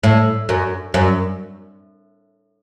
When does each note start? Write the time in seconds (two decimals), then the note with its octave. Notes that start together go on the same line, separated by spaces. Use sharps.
0.03 A2
0.49 F#2
0.94 F#2